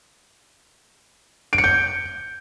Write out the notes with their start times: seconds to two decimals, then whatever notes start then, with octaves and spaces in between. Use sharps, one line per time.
1.53 D7
1.58 C#7
1.64 G6